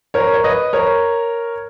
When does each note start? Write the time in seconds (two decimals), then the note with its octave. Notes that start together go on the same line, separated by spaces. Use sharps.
0.14 A#4 C#5
0.34 C#5
0.44 B4 D#5
0.73 A#4 C#5